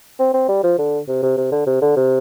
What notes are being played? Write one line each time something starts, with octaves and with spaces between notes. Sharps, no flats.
C4
C4
G3
F3
D3
C3
C3
C3
D3
C3
D3
C3